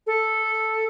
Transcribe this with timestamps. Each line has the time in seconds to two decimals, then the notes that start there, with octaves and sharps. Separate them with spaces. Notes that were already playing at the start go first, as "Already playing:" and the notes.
0.07 A4